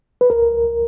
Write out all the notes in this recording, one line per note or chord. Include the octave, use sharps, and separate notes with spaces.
B4
C#2 A#4
C#2